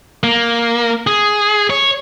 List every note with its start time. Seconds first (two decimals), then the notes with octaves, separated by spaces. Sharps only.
0.23 A#3
1.07 G#4
1.70 C#5